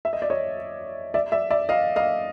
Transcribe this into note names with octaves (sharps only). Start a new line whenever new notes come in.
E5
D#5
D5
C#5 D#5
D5 E5
D5 E5
D5 E5
D#5 F5
D#5 F5